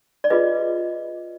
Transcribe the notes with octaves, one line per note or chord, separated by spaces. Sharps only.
D5
F4 G#4 B4 D#5